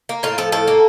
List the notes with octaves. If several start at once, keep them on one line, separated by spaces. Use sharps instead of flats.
A#3
A2 F4
F3 A4
A2 A4
A#3